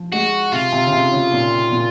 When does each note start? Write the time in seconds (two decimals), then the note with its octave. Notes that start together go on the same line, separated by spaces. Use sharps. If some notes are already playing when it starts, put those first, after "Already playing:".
Already playing: F3
0.13 G#3 F#4
0.52 C3 F4
0.72 C3
0.86 C#3
0.92 C3
1.12 C#3
1.32 A#2
1.71 A#2